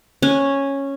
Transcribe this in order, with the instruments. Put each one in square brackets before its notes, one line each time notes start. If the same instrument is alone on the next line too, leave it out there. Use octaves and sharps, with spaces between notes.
[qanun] C#4